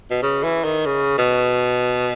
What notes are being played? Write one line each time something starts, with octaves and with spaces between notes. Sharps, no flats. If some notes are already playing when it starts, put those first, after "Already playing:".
B2
C#3
E3
D#3
C#3
B2